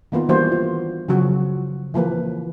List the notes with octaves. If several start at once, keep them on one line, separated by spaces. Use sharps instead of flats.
D#3 A#3 B3 F4
E3 G3 A#3 D4 F#4 C5
F4
C#3 F3 F#3 F#4
E3 F3 A#3 B4